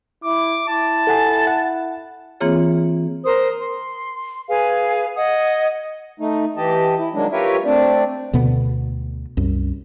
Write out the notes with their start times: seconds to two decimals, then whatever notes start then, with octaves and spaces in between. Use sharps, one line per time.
0.24 E4 D6
0.68 E4 A5
1.07 A4 F#5 G#5
1.47 F#5
2.40 E3 A#3 C4 F4 G#4 C#5
3.24 A#4 C5 D#6
3.59 C6
4.49 G#4 B4 F5 G#5
5.16 D#5 F#5 D#6 G#6
6.20 A3 D#4
6.57 E3 G4 D#5 A5
6.99 E4
7.14 D#3 F#3 G#3 A#3 D4
7.32 F4 G4 A#4 B4 C#5 E5
7.65 A3 C4 D4 D5
8.33 D2 B2 D3 B3
9.37 C2 F#2